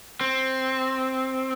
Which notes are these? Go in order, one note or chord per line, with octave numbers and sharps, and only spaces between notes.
C4